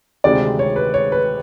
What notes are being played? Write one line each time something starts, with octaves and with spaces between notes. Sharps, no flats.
D2 C3 D#3 G#3 C4 D5
C#5
B4
C#5
B4